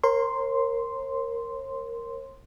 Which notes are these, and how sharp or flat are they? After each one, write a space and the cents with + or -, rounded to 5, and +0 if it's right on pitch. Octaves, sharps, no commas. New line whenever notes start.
A#4 +0 C#5 -45 C6 -5